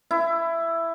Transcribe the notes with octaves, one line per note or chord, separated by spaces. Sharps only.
E4